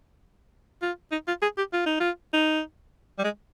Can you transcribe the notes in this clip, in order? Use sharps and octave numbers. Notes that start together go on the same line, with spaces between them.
F4
D#4
F4
G#4
G4
F4
D#4
F4
D#4
G3
G#3